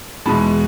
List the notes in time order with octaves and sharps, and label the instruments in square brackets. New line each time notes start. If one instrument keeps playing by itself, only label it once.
[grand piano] E2 B2 G#3 A5 B5